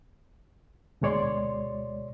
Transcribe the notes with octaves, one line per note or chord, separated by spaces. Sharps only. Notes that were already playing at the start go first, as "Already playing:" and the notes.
D2 B2 G#3 C#5 D5 C6